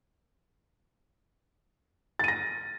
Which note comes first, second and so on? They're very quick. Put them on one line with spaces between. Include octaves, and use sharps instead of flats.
A6 D#7 A#6